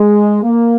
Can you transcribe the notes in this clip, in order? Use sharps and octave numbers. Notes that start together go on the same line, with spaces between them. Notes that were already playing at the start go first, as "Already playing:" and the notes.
Already playing: G#3
A#3